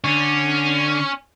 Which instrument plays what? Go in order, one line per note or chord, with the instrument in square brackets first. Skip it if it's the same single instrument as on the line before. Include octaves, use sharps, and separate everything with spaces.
[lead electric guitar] D3 [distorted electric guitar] C#4